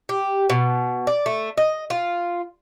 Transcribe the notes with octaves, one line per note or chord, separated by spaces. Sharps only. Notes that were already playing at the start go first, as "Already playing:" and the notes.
G4
B2
D5
A3
D#5
F4